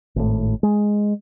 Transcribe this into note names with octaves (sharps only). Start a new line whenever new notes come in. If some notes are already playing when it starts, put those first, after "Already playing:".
G#1 A2
G#3